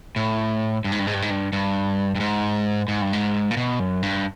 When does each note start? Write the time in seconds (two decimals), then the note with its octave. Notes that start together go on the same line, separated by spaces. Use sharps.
0.16 A2
0.84 G2
0.92 G#2
0.99 G2
1.07 G#2
1.14 G2
1.22 G#2
1.30 G2
1.53 G2
2.15 G2
2.20 G#2
2.88 G#2
3.01 G2
3.13 G#2
3.51 A#2
3.57 B2
3.79 F#2
4.03 G2